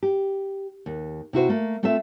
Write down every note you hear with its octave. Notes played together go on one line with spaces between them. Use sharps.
G4
D#2
C3 E4 F#4 C5
A3 A#3
A3 C4 F4 A4 E5